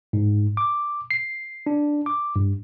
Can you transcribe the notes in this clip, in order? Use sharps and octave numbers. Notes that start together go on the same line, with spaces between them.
G#2
D6
C7
D4
D6
G2